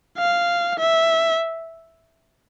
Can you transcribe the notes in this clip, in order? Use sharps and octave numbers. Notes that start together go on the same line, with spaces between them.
F5
E5